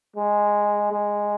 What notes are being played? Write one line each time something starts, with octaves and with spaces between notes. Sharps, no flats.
G#3
G#3